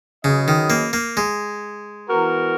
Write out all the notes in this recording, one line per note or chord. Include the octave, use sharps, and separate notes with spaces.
C#3 F#3 C#4 G#4 B4 D#5
D#3
A#3
A#3
G#3
E3 B3 F#4 A#4